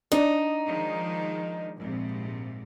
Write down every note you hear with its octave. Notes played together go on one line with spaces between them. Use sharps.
D4 D#4
D#3 F3 G#3
A#1 G#2 C3